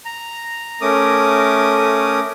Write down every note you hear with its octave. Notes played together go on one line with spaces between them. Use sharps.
A#5
A3 C#4 A#4 D6 D#6